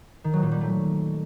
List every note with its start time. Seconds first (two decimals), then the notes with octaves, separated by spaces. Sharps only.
0.24 D#3
0.33 F#3
0.42 A#2
0.52 G3
0.61 A3